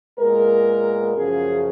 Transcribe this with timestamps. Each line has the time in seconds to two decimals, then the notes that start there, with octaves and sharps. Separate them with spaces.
0.19 A#2 G#3 B3 A#4
1.14 F#2 C#3 F3 G#4